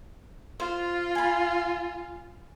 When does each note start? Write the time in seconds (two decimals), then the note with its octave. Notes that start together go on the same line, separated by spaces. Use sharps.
0.60 F4 C5
1.15 G#5 B5